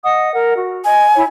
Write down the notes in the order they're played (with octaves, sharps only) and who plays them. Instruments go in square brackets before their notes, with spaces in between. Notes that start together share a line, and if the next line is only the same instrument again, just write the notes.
[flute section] D#5 F#5 D#6
A#4 F#5
F#4
[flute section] D#5 [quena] G#5
[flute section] E4 C#5